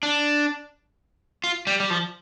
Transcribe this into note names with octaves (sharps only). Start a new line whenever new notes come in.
D4
F4
G3
G3
F3